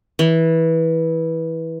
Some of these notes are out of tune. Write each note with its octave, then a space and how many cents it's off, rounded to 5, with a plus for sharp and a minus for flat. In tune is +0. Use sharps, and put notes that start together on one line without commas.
E3 -15